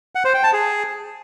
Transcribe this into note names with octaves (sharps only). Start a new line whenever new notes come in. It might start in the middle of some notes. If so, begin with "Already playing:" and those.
F#5
C5
G5
A5
G#4